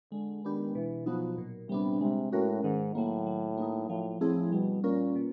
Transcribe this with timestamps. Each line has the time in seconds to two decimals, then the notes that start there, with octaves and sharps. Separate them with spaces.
0.12 D3 G#3
0.44 D#3 B3 D4 G4
0.75 B2 E3
1.06 F3 F#3 B3 D#4 F#4
1.38 A#2
1.69 C3 G3 B3 D4
2.01 C3 G#3
2.32 A2 C#4 F#4 A#4
2.63 G#2 D#3
2.95 A2 F#3 A#3
3.26 F#3
3.57 A#3 D#4
3.89 A2 F3
4.21 A2 A3 C4 E4 G#4
4.52 B2 G3
4.83 A#2 A#3 C#4 F4 A#4
5.15 B2